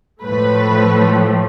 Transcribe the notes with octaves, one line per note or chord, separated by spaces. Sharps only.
A2 F3 A3 B4